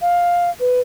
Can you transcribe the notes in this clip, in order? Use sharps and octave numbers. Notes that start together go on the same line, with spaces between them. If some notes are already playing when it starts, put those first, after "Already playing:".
F5
B4